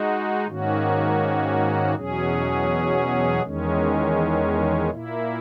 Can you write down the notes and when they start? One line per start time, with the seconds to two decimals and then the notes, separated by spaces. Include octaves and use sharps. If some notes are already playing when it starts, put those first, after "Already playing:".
Already playing: G#3 D#4 F#4
0.47 G#2 D#3 A#3 C#4 F#4
1.95 E2 B2 F#3 C#4 G#4
3.43 E2 D#3 G#3 C#4
4.91 A#2 A#3 E4